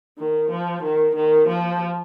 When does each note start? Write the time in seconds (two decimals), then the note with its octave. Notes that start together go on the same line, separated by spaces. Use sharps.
0.18 D#3
0.50 F3
0.83 D#3
1.16 D#3
1.48 F3